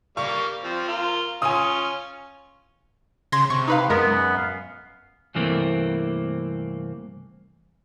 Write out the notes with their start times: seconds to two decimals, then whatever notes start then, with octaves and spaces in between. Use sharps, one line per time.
0.17 G3 A#3 F5 C#6
0.64 F3 C4
0.88 F4 A#4
1.42 C#4 F4 G#5 D#6
3.32 C#3 C6 G#6 A#6
3.50 C3 C#6
3.68 D#4 B4 F5
3.90 F#2 G#3 B3 A#4
4.37 F5
5.35 C2 G2 E3 A3 A#3 C4